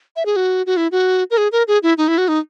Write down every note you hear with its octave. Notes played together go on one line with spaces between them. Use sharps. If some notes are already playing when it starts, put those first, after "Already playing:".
E5
G#4
F#4
F#4
E4
F#4
A#4
G#4
A#4
G#4
E4
D#4
E4
F#4
D#4